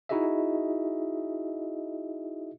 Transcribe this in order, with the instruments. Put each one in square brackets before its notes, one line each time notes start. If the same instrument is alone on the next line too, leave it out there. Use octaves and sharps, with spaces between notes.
[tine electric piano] D#4 E4 F#4 G#4 D#5 E5